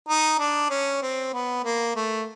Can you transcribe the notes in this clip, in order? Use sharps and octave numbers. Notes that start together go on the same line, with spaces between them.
D#4
D4
C#4
C4
B3
A#3
A3